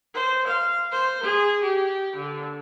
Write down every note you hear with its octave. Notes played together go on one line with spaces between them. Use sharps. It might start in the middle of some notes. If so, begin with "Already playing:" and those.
C5
F5
C5
G#4
G4
D3